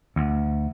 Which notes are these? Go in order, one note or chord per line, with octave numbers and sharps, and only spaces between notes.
D2